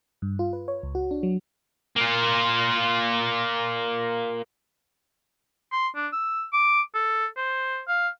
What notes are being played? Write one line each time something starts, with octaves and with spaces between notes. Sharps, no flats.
G2
F4
B4
C#5
C#2
F#4
D4
F#3
A#3 F4
C6
D4
E6
D6
A4
C5
F5